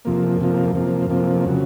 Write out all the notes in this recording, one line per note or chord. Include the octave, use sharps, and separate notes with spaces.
F2 C3 F3 A#3
F2 C3 F3 A#3
F2 C3 F3 A#3
F2 C3 F3 A#3
C#3 F#3